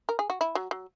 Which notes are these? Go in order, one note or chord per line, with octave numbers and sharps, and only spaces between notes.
A#4
G#4
F#4
E4
F#3
F#3